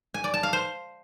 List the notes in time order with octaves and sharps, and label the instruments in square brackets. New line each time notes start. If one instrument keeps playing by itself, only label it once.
[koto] G#5
D5
A5
F5
C5